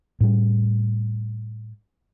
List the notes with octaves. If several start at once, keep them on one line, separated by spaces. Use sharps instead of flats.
A2 G3